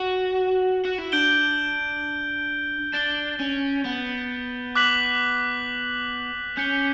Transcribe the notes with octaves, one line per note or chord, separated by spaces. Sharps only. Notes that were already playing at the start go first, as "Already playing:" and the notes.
Already playing: F#4
F#4
E4
D4 G6 D7 G7
D4 A6 D7 G7
C#4
B3
D6 F#6 B6 F#7
C#4 G6 C#7 G7